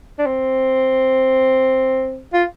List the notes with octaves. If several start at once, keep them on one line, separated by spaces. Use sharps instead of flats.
D4
C4
F4